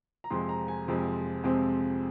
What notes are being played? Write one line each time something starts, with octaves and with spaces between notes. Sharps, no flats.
A#5
F2 C3 F3 G#3 C4 C6
A#5
G#5
F2 C3 F3 G#3 C4
F2 C3 F3 G#3 C4